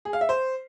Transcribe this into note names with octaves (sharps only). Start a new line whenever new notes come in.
G#4
F5
E5
C5